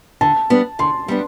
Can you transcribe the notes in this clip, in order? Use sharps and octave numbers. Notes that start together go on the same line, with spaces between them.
D3 A5
G3 B3 D4
D3 C6
G3 B3 D4